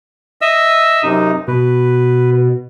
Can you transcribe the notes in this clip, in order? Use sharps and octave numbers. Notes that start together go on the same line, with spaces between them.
D#5 E5 E6
F#2 C3 D#4
B2 B4